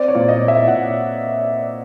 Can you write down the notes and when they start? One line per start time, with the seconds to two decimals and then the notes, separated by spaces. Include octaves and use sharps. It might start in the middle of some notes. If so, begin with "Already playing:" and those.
Already playing: C4 D5
0.08 C#5
0.15 A#2
0.29 D#5
0.41 A#2
0.48 E5
0.68 A#2 F#5